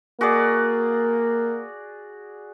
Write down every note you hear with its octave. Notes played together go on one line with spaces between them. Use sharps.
A#3 F#4 G#4 D5